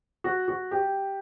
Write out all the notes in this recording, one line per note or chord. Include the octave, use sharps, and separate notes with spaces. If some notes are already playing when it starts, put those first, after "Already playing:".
F#4
F#4
G4